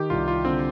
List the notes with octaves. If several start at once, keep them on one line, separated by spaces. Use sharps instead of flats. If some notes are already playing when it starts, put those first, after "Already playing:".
Already playing: D#3 G4
C2 F4
F4
D3 C4